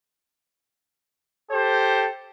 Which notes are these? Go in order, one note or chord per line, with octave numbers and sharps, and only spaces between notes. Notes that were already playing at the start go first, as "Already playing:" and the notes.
G4 A4 C5